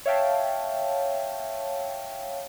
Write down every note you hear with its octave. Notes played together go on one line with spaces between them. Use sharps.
C#5 E5 F5 G5 A5